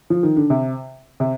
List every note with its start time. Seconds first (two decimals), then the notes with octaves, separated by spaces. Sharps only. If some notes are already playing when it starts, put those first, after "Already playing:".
0.10 F3
0.23 D#3
0.36 D3
0.50 C3
1.20 C3